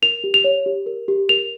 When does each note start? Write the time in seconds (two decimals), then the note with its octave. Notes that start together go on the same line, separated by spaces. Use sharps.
0.02 A#4 F7
0.24 G4
0.34 F7
0.44 C#5
0.66 G4
0.86 A#4
1.08 G4
1.29 A#4 F7